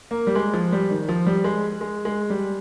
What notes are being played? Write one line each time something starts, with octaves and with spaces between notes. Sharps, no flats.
A#3
G3
G#3
F3
G3
D#3
F3
G3
G#3
G#3
G#3
G3